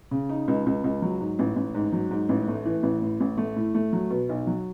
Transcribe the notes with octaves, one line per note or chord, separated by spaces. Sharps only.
C#3
D#4
C#2
C#2
C#2
F#3
G#2
A1
A1
G#2
F#3
G#2
A1
A3
E3
A1
A2
A1
A3
A2
A3
F#3
B2
B1
F#3